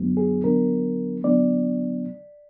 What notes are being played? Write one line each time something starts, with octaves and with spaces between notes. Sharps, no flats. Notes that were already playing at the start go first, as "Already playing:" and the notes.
Already playing: F#2 D3 F#3 B3 D4
G#4
D3 F#3 B3 D4 A#4
D3 F#3 B3 D4 D5